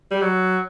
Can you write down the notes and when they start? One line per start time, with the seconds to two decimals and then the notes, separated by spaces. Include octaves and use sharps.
0.11 G3
0.22 F#3